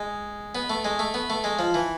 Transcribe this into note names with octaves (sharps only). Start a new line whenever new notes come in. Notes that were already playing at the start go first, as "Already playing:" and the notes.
Already playing: G#3
B3
A3
G#3
A3
B3
A3
G#3
F3
E3